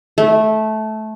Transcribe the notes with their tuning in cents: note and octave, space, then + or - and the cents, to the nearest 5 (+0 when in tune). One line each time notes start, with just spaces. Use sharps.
A3 -15